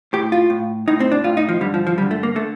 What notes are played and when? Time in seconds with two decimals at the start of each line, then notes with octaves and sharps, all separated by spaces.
0.13 A2 G4
0.32 F4
0.50 A2
0.88 A2 D#4
1.00 C4
1.12 D4
1.24 A2 F4
1.37 D#4
1.49 F3
1.61 G2 D3 G3
1.74 F3
1.87 F3
1.98 G2 D3 G3
2.11 A3
2.23 A#3
2.35 D3 A3